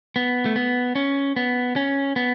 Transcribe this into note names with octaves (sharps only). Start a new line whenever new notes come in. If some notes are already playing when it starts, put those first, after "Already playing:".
B3
A3
B3
C#4
B3
C#4
B3